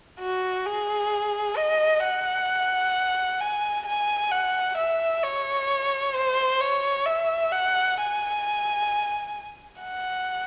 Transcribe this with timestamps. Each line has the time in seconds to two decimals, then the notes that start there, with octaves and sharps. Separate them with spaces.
0.20 F#4
0.66 G#4
1.57 D#5
2.03 F#5
3.40 G#5
3.86 G#5
4.31 F#5
4.77 E5
5.23 C#5
6.15 C5
6.60 C#5
7.06 E5
7.52 F#5
7.97 G#5
9.81 F#5